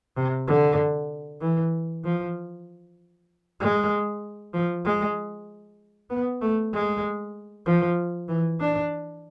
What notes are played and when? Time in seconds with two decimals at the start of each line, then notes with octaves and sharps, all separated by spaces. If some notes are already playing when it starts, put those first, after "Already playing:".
0.17 C3
0.48 D3
1.41 E3
2.04 F3
3.60 G#3
4.53 F3
4.85 G#3
6.10 B3
6.41 A3
6.73 G#3
7.66 F3
8.28 E3
8.60 D4